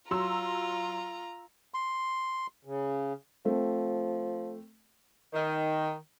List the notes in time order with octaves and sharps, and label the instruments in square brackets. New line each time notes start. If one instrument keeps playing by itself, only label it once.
[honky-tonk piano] F#3 C6 E6 [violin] F4 A#5
[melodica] C6
[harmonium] C#3
[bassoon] F3 [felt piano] A3 C4
[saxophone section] D#3